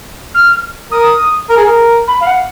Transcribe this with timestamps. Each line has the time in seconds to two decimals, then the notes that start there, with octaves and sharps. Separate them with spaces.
0.34 F6
0.91 A#4 D#6
1.50 A#4
1.57 G#4
1.65 A#4
2.07 B5
2.20 F5
2.26 F#5